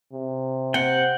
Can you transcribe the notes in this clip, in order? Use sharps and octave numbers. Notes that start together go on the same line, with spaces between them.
C3
C4 F#5 G5